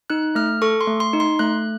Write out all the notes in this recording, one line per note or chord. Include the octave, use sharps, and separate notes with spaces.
D#4 F#6
A3 F6
A4 C#6
C6
A3
C6
D#4
C6
A3 F#6